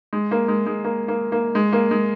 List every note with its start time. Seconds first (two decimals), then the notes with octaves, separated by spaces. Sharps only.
0.13 G#3
0.31 A#3
0.48 G#3
0.66 G#3
0.84 A#3
1.08 A#3
1.32 A#3
1.55 G#3
1.73 A#3
1.91 G#3